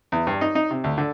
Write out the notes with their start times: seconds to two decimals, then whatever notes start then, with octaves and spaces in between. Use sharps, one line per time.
0.12 E2
0.27 G2
0.41 D#4
0.55 D#4
0.70 C3
0.84 D2
0.98 D3